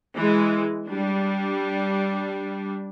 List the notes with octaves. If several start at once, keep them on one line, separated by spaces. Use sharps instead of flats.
E3 G#3
G3 D4